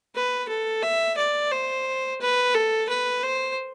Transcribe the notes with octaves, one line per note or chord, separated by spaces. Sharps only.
B4
A4
E5
D5
C5
B4
A4
B4
C5